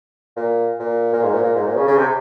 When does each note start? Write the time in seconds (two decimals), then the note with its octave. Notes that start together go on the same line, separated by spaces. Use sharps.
0.36 A#2
0.80 A#2
1.13 A#2
1.23 G#2
1.33 A#2
1.44 A#2
1.55 G#2
1.66 A#2
1.77 C#3
1.87 C#3
1.98 C3